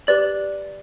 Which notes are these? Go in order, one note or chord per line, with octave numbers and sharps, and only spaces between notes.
G4 B4 D5 F#7